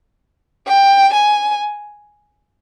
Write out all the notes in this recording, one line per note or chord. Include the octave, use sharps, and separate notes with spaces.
G5
G#5